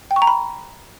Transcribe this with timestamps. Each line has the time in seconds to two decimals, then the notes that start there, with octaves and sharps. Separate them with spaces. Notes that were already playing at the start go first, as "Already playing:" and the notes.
0.11 G5
0.16 C#6
0.22 A#5
0.27 B5